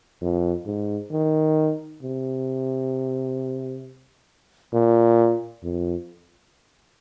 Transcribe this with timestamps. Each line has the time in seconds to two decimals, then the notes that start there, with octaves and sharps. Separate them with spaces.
0.22 F2
0.66 G#2
1.11 D#3
2.03 C3
4.73 A#2
5.64 F2